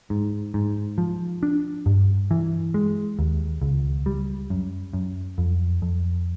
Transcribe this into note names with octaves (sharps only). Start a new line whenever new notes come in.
G#2
G#2
F3
D4
G2
E3
G#3
D#2
C#2
G3
F#2
F#2
F2
F2